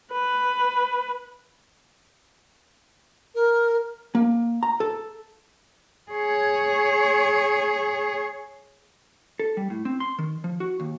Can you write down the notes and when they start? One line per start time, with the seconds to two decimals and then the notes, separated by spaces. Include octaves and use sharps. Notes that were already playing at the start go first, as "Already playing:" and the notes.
0.13 B4
3.34 A#4
4.15 A#3
4.63 A#5
4.80 A4
6.12 G#4 C#5
9.40 A4
9.57 G3
9.70 A2
9.85 C4
10.00 C6
10.19 D#3
10.44 F3
10.60 F#4
10.80 D#2